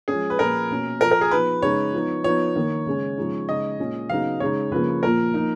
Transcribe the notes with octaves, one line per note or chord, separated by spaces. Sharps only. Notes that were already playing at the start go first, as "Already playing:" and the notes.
F3 G#3 C#4 G#4
B4
A#2 F3 A#3 C#4 A#4
B2 A#3 C#4
A#2 F3 A#3 A#4
A#4
G#4
F3 B3 D#4 B4
C#3 G#3 D#4 C#5
F3 B3 D#4
F3 B3 D#4 C#5
D#3 A#3 D#4
C#3 G#3 C#4
C#3 F3 G#3 D#4
C#3 G#3 D#4 D#5
A#2 G#3 C#4
C#3 F#3 B3 D#4 F5
C#3 G#3 D#4 C#5
C#3 F3 A#3 B4
A#2 F3 A#3 A#4
F3 A#3 D#4